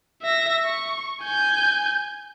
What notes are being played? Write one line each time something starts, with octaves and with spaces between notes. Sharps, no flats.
E5 A#6
C#6
G#5 G6